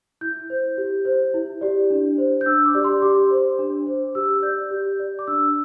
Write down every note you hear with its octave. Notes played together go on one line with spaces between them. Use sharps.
E4 G6
C5
G4
C5
E4
G4 D5
D4
C5
G6
D4 E6
D6
G4 D5
C6
G4 D6
C5
D4
C5
G4 E6
D5 G6
G4
D5
D6
D4 E6